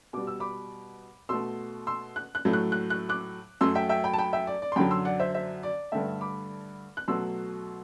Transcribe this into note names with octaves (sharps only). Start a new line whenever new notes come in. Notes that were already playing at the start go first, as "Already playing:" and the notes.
B2 G3 D6
E6
B5 D6
B2 A3 C6 E6
C6 E6
F#6
F#6
A2 F#3 A3
F#6
F#6
F#6
D6 F#6
F#2 F#3 A3 C6 E6
E5 G5
E5 G5
G5 B5
A5
G5 B5
E5 G5
D5
D5
C6
F#2 D3 F#3 G5 B5
C6 E6
D5 F#5
C5 E5
C5 E5
D5
G2 D3 A3 E5 G5
B5 D6
F#6
B2 F#3 A3 C6 E6